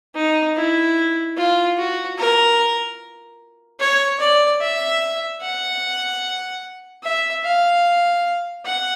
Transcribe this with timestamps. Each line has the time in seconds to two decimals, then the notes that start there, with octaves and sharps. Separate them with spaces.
0.15 D#4
0.56 E4
1.37 F4
1.77 F#4
2.18 A#4
3.80 C#5
4.20 D5
4.61 E5
5.41 F#5
7.03 E5
7.44 F5
8.65 F#5